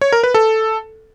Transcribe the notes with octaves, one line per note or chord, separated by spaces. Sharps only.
C#5
A#4
B4
A4